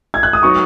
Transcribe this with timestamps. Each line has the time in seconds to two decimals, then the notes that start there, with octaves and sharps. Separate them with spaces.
0.14 G#6
0.23 F#6
0.33 D#6
0.42 F#3 B3 D#4 F#4 C#6